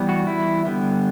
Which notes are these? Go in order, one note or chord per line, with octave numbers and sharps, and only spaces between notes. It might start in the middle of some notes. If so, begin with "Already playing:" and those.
Already playing: E3 G3 B3
F#4
E4
D3 G3 B3